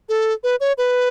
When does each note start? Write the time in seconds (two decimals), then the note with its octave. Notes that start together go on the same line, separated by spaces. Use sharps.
0.09 A4
0.44 B4
0.60 C#5
0.78 B4